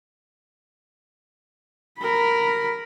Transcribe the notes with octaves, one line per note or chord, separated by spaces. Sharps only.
A#4 B5